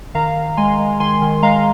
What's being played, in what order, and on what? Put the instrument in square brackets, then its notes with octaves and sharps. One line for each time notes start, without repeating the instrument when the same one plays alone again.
[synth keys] D#3 F5 A#5
D#3
G#3 G#5 C6
G#3
D#3 G#5 C6
D#3
G#3 F5 A#5